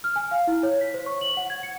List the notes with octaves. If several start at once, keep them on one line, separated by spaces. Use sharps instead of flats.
F6
G#5
F5
E4
C#5
B6
C5
C#6
F#7
F#5
G#6
C#7